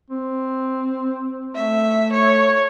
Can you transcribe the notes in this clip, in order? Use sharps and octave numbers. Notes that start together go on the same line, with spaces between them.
C4
A3 E5
C#5